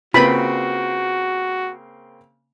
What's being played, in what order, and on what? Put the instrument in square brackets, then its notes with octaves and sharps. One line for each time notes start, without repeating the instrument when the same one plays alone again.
[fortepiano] C#3 A#3 C4 [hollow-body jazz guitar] F4 B4 [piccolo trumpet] F#4 [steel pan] B5